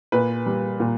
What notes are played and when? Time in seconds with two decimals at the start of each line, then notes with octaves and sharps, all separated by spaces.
0.12 A#2 B4
0.46 G3
0.80 A#2